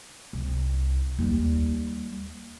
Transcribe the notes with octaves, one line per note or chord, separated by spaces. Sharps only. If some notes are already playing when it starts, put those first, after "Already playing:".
C2
D#2 G3